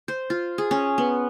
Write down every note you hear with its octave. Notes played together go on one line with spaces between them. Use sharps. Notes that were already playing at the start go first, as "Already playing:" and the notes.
C5
F4
G#4
C#4
B3